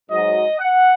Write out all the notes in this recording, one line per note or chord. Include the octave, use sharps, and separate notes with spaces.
G#2 F#3 D#5
F#5